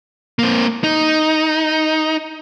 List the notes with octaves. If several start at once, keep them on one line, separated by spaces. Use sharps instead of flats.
A#3 C4
D#4